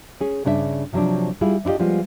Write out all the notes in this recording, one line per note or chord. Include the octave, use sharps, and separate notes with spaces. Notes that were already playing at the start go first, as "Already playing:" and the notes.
C#4 G#4
G2 C#3 D4 A#4 E5
C3 F3 F#3 C4 D4
G3 E4 F4 G#4
D4 E4 F4 G4 D#5
F3 G3 G#3 B3 F4